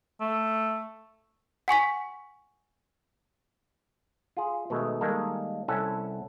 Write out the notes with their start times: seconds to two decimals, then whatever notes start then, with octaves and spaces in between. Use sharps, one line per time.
0.21 A3
1.68 F#5 G#5 C#6 B6
4.37 F4 G#4
4.70 B2 D#3 G#3 A3
5.01 D#3 G3 G#3 A#3 A4
5.68 C2 C#4 E4 A4 F#5 G#5